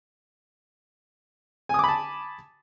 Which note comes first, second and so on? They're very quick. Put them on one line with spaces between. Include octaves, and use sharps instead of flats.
G#5 D#6 D6 B5 A5